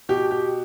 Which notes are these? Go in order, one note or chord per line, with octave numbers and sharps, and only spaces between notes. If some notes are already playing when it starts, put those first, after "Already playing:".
B2 G4
G4